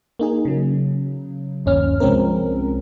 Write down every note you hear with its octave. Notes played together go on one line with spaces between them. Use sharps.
A#3 D#4 G#4
C#3 F#3
G1 D#2 C#4 F6
C2 F3 G#3 C4 C#4 A#4